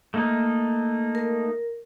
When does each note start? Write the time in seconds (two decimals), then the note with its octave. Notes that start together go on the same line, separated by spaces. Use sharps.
0.14 A3 A#3 D#4
1.15 A#4